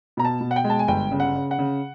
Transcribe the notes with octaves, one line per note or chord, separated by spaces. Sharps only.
B2 A#5
A5
B2
F#5
G5
G#3
A5
G#5
G1 G5
C#3
F#5
C#3
F#5
C#3